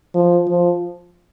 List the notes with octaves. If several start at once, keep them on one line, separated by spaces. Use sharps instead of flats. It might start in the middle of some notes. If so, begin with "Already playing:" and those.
F3
F3